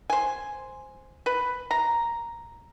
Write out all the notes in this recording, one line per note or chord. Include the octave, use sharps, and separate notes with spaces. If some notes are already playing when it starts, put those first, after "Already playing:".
C5 G#5
B4
A#5